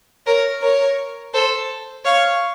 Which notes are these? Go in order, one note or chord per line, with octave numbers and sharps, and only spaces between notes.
A#4 C#5
A#4 C#5
A4 C5
C#5 F5